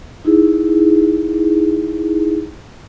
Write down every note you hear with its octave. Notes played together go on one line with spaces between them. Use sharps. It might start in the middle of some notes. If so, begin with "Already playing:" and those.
D#4 E4 G#4